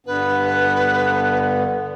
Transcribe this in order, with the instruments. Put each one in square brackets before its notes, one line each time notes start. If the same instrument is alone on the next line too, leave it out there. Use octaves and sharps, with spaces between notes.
[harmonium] G2 D3 B3 [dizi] B4